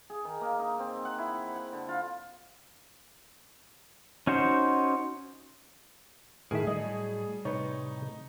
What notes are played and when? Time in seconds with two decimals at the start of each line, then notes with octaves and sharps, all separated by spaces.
0.10 G#4
0.25 D#3
0.41 A#3
0.59 D#4
0.79 C4
1.05 F#5
1.18 E4
1.56 F#5
1.73 D3
1.88 F4
4.27 C#4 D#4 F#4 C5
6.51 A2 D#3 G#4 A#4 E5
6.67 A2 F#3 G3 D#5
7.45 A2 C3 D#4 B4 C#5